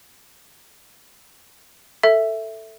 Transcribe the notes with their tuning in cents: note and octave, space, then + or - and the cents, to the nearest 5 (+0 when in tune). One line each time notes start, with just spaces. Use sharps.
A4 +10 E5 +0